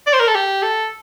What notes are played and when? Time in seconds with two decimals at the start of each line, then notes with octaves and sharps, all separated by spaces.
0.07 D5
0.13 C5
0.20 A#4
0.28 A4
0.35 G4
0.62 A4